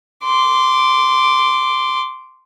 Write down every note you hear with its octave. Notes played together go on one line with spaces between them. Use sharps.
C6 D6